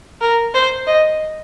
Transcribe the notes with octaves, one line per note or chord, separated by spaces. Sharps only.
A#4
C5
D#5